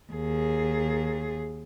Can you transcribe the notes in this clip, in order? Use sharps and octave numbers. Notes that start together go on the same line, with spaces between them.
D#2 G#4